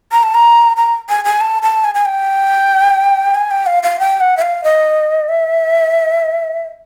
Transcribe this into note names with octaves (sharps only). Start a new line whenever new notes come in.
A#5
A5
A#5
A#5
G#5
G#5
A5
A5
G#5
G#5
G5
G#5
G5
F5
F5
G5
F#5
E5
F5
D#5
E5